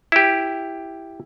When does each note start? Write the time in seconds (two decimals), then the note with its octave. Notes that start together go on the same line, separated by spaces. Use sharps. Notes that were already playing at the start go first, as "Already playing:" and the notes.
0.12 E4 G4